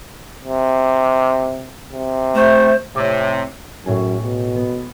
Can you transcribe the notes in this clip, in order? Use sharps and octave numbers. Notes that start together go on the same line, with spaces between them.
C3
C3
A3 C5
A2 C3 C#5 D6
F#2 A2 G#4
B2
B3